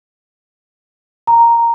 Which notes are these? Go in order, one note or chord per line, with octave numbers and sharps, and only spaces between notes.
A#5